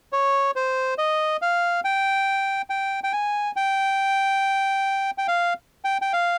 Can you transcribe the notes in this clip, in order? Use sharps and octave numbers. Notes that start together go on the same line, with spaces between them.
C#5
C5
D#5
F5
G5
G5
G5
G#5
G5
G5
F5
G5
G5
F5